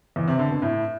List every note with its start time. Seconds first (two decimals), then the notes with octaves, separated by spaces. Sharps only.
0.16 E2
0.28 C3
0.39 D3
0.51 B2
0.62 A2